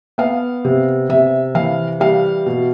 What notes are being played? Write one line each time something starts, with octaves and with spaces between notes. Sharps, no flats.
B3 F5
C3
C3 E5
E3 F5
G3 F5
B2